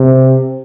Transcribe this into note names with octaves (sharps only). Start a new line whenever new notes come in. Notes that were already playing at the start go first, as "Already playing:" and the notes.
Already playing: C3